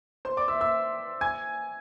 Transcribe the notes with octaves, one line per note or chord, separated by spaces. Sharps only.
C5 C6
D5 D6
E5 E6
E5 E6
G#5 G#6